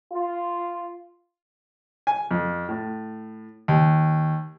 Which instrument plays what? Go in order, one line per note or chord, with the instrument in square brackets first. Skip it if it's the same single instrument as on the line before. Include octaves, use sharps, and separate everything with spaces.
[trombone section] F4
[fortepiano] G#5
F2
A2
D#2